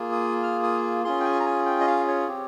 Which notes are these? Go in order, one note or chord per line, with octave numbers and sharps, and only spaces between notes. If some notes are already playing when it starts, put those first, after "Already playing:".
Already playing: A#3 F4 G#4
D#6
F6
D#6
C#4 F4 G#4 C6
G5
G#5
A#5
G#5
G5
D#5
F5
C#5
C4 G4